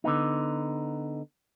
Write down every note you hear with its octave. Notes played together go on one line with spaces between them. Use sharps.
D3 B3 D#4